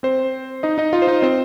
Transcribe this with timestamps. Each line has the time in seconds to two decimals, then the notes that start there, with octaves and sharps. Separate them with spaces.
0.03 C4 C5
0.63 D#4 D#5
0.78 D#4 D#5
0.93 F4 F5
1.02 C5
1.07 D#4 D#5
1.22 C4 C5